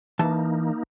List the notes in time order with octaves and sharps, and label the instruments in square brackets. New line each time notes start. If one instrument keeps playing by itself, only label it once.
[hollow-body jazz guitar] E3 A5 [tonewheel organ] A#3 D#4